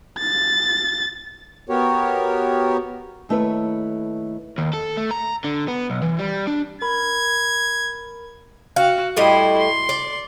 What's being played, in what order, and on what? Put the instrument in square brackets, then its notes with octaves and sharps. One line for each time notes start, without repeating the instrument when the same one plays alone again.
[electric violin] A6
[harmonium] B3 F#4 G4 A#4 C#5
[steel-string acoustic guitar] D#2 A3 E4 B4 C#5
[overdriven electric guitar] D#2
A4
A3
A#5
D3
B3
B1
E3
G3
D4
[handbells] A#4 B5 [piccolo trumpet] G#6
[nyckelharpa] F#4 [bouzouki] F5
[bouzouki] A2 G3 D#5 [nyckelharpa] E4 C6
[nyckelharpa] C6
[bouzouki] D5